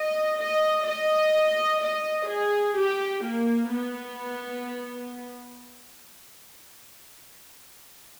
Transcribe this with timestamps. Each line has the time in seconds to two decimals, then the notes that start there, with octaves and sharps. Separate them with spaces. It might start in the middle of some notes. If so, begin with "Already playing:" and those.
Already playing: D#5
0.41 D#5
0.87 D#5
1.83 D#5
2.30 G#4
2.78 G4
3.26 A#3
3.72 B3